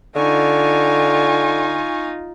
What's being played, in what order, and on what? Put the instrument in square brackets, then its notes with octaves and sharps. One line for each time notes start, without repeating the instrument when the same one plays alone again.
[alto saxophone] D3 [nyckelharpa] D#4 F4 [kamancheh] G#5 C#6